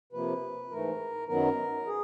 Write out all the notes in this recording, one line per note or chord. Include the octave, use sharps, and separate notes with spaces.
C3 F3 A#3 B4
G#2 E3 A3 A#4
F#2 D#3 F#3 B3 A#4
G#4